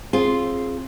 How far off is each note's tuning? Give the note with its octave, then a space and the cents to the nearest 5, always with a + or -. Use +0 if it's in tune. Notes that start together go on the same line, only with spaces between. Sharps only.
C4 +30 F4 +0 G#4 +10